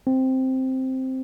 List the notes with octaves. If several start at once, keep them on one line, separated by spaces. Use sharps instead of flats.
C4